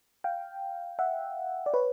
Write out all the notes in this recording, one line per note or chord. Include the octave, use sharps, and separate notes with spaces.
F5 G5
E5 F#5
D5
B4 C#5